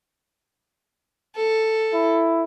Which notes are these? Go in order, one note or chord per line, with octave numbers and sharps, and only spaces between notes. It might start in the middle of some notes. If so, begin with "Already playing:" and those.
A4
E4